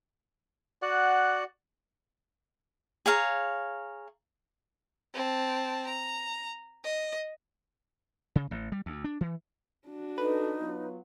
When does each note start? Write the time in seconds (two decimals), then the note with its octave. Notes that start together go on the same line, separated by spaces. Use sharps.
0.82 F#4 D5 F#5
3.06 G#4 C#5 F5 A#5
5.14 C4 A5
5.87 A#5
6.84 D#5
8.36 C#3
8.51 A1
8.72 G3
8.86 D2
9.04 D4
9.21 E3
9.87 D4 F#4
10.18 D#4 A4 B4
10.59 F#3 B3 F4